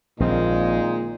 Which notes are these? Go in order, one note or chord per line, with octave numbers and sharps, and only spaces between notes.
A#1 A#2 D#3 G#3 C4 D#4 F4